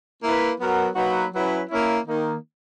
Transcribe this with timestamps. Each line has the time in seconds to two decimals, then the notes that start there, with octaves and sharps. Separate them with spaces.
0.23 A#3 E4 B4
0.60 F#3 B3 F#4 A#4
0.96 F#3 A#3 D#4 F#4 B4
1.34 F#3 C#4 E4 B4
1.70 A#3 C#4 E4
2.06 D#3 A#3 D#4